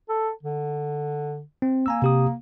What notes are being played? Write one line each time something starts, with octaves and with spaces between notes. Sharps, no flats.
A4
D3
C4
A#3 G#5 A#5 E6
C3 G4 D#6